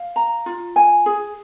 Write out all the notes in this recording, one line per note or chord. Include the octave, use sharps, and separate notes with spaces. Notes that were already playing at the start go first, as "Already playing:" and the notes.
Already playing: F5
A#5
F4
G#5
G#4